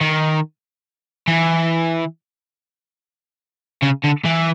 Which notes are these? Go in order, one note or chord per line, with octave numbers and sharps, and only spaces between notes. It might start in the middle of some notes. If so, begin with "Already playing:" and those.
D#3
E3
C#3
D3
E3